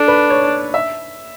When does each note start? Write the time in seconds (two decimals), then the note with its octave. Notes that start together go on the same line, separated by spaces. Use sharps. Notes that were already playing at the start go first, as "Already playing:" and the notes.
Already playing: D4 A4
0.08 B4
0.30 C#5
0.74 E5